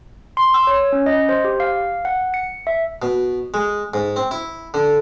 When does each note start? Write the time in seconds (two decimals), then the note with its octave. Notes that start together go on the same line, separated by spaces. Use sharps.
0.37 C6
0.54 E6
0.67 C#5
0.92 C#4
1.06 D#5
1.29 C5
1.44 G4
1.60 F5
2.05 F#5
2.34 C#7
2.67 E5
3.02 B2
3.54 G#3
3.94 G#2
4.16 C4
4.31 E4
4.74 D3